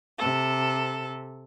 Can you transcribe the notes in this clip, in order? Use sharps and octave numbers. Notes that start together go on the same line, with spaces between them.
C3 A4